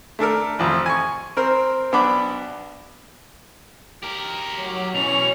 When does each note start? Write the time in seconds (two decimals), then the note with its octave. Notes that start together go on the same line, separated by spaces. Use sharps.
0.19 A3 D4 A4 A#4
0.59 A1 F2
0.86 G#5 C#6
1.37 C4 A#4 C5
1.92 B1 B3 D4 B5 D6
4.03 G4 A#4
4.57 F#3
4.94 B2 E3 C#4 C#6 F7